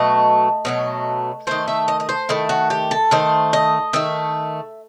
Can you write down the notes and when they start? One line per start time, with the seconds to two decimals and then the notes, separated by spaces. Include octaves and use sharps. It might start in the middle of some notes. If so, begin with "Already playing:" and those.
Already playing: B2 F#3 A3 D#5
0.65 B2 F#3 A3
1.47 D#3 A3 C5
1.68 E5
1.88 D#5
2.00 D#5
2.09 C5
2.29 D#3 A3 E4
2.49 F#4
2.70 G4
2.91 A4
3.11 D#3 A3 C5
3.53 D#5
3.93 D#3 A3 E5